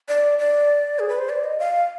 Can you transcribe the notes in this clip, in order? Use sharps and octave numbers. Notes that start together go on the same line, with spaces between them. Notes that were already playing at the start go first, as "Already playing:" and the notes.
D5
D5
G#4
B4
C5
D5
D#5
F5